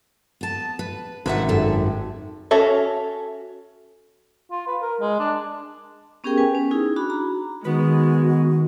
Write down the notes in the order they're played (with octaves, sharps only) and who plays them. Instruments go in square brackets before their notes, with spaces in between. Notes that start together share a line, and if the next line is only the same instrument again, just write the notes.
[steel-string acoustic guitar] B3 A5
B4
[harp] G#1 [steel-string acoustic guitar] B4 E5 F#5
[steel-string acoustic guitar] F#2 G3 A4
[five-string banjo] C#4 F#4 A4 C#5 E5
[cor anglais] F4
B4
A#4
G#3
D4
[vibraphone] B3 C#4 G4 G#4 A#4 G5
B4 G#5
C#4
D#4 E4 G#4
D4 F#4 B5
A#5
[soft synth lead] D#3 [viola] G#3 [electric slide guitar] B3 B4 [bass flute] F#4